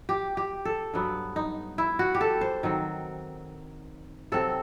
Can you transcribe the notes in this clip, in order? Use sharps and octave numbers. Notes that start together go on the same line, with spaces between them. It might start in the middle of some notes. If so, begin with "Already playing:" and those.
G4
G4
A4
G2 F#3 B3
D#4
E4
F#4
G4
A4
C5
D#3 F#3 C4
C3 F#3 C4 A4